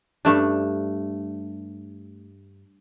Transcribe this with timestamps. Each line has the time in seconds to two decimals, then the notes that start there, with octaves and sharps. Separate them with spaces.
0.25 G2 A3 D4